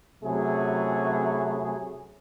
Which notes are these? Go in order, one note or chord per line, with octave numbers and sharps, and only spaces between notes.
C3 F#3 A3 C#4 E4 G#4